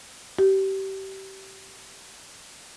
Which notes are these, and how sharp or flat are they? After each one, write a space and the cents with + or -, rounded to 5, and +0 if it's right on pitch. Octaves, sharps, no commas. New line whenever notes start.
G4 -25